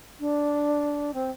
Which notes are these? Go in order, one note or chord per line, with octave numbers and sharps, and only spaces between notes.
D4
C4